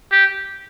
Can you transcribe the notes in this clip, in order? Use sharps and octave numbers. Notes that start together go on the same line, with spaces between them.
G4